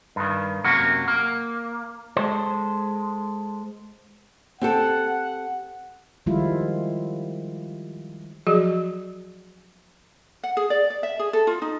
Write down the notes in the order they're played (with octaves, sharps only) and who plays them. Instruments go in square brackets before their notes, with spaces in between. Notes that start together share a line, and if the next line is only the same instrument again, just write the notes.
[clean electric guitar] G2 D#3
F#2 C3 A#3 F#4
A#3
G#3 A4 C5
[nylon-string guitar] C4 G4 A4 [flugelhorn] F#5
[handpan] D#3 F3 G3 G#3 E4 F4
[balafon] F3 F#3 F#4 G#4 D#5
[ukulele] F#5
G#4
D5
D5
E5
G#4
A4
F4
D#4